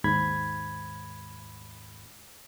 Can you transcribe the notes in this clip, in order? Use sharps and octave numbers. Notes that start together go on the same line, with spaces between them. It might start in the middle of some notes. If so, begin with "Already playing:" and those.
D#2 G#2 B5 G#6